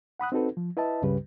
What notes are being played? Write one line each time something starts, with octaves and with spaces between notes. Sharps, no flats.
F#5 B5 D#6 F#6
C4 D#4 F#4 A4 B4
F3
E4 B4 D#5 E5 A5
C#2 G2 C#3 G3 G4 B4